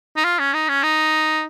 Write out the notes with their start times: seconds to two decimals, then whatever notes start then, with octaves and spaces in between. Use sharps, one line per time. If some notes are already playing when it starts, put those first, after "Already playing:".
0.17 D#4
0.24 F4
0.39 C#4
0.54 D#4
0.69 C#4
0.83 D#4